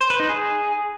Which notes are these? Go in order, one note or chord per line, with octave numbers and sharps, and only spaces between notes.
C5
B4
D#4
G#4